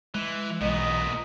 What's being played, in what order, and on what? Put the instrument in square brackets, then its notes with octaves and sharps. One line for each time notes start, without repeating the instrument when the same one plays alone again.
[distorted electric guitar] E3 [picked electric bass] G#3
[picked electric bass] B1 E3 [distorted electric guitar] A#2 B3 [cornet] D#5